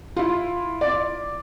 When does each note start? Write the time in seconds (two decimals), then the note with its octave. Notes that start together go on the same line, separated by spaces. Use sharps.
0.16 E4 F4
0.81 D5